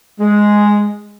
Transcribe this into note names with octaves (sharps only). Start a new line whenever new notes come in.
G#3